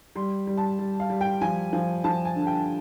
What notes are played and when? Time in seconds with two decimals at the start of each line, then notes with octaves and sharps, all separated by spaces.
0.16 G3 C6
0.47 G3
0.57 A5
0.79 G3
1.00 F5
1.10 G3
1.21 G5
1.41 F3 G#5
1.73 F3
2.04 F3 A5
2.25 G#5
2.35 D3
2.47 G5